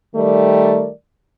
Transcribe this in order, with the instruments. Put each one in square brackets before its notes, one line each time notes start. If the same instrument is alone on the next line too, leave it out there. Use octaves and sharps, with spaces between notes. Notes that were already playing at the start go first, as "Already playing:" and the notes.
[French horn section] D#3 G3 A3 A#4 D5